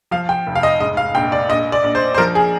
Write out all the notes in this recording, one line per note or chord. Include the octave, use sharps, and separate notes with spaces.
F3 F5
G5
F1
F5
D#5
G#2 D#5
F5
A#1 G5
D5
A#1 D#5
D5
A#1
C5
C5
F3 A#4
G#4